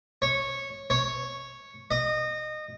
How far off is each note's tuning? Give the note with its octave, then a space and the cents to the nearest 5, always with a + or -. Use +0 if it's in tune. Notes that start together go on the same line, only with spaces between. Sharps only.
C#5 -10
C#5 -5
D#5 -25